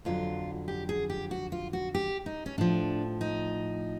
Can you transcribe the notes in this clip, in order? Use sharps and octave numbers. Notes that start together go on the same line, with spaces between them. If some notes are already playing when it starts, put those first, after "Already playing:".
F2 D3 F#3 F4
G4
G#4
G4
F#4
F4
F#4
G4
D#4
C#4
A2 F3 D4
D#4